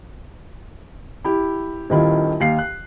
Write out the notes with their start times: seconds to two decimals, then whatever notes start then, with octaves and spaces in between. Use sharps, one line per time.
1.24 E4 G4
1.90 D#1 D#3 E4 F4
2.40 D#2 F5 C7
2.59 F#6